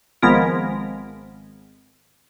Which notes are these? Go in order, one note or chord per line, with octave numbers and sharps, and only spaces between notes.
G#1 F3 G#3 B3 F4 A#4